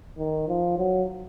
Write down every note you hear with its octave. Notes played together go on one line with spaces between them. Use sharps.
D#3
F3
F#3